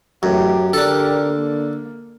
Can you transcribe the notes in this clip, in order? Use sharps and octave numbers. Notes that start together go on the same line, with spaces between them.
A1 F#2 G4
D3 D4 G4 A4 A#4
A#3